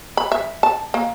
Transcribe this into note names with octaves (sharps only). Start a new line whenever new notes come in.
B5
E5
A5
A#3